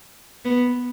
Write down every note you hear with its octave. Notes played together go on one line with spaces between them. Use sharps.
B3